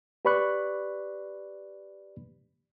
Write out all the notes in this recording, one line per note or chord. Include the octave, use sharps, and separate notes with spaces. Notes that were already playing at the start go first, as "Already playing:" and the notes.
G4 B4 D5 B5 C#6 F#6